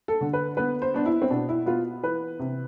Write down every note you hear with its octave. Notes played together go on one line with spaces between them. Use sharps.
A4
D3
B4
B3 B4
C5
B3 D4
E4
C4
B2 D4
E4
B3 F4
E3 B4
C3